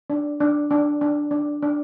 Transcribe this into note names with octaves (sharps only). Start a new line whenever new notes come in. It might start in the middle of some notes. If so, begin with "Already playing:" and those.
D4
D4
D4
D4
D4
D4